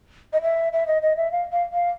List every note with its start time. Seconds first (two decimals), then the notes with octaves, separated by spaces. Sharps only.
0.33 D#5
0.42 E5
0.73 E5
0.87 D#5
1.02 D#5
1.17 E5
1.32 F5
1.52 F5
1.73 F5